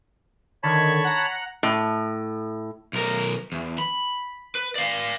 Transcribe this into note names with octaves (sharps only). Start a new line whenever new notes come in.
D3 D#3 C#5 A5 B5 G#6
F#5 A#5
A2
B1 A#4
E2
B5
B4
D5 F5